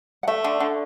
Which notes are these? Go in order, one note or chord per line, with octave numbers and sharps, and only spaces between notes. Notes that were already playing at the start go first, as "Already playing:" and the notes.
F#5
A3 E5
D3
D3